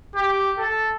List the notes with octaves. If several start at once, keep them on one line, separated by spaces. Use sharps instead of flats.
G4
A4